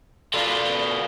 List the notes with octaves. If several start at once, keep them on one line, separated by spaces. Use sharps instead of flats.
B2 F4 A4 D5 F5